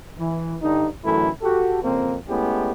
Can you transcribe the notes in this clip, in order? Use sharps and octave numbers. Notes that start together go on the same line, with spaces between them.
E3
G2 D3 G3 D#4
A1 F#2 D3 E3 A3 E4
F#4 G4 A4
F2 C#3 A#3 C4
G#3 A3 B3 C#4 E4 G4